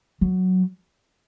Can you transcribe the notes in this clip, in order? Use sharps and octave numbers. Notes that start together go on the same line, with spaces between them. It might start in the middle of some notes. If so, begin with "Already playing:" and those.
F#3